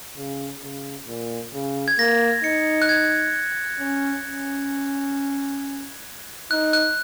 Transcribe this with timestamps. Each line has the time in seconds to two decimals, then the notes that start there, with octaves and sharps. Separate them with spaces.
0.17 C#3
0.63 C#3
1.08 A#2
1.54 C#3
1.88 G#6
1.98 A#3 A#6
2.44 D#4 C#7
2.82 F#6
2.89 G#6
3.80 C#4
4.25 C#4
6.51 D#4 F#6
6.73 F#6